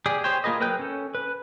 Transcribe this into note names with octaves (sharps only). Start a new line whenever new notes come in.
G4 G#4 D5
G4 G#4 C5 C#5 G5
A#3 F4 G#4 B4 D#5
F#3 A#4 B4 G5 G6
C#4 A4
B4